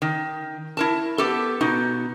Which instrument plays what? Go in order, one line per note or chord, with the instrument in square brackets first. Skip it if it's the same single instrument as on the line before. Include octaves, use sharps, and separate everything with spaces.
[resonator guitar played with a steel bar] D#3
E4 A#4 A5
B3 G4 A4
B2 D#4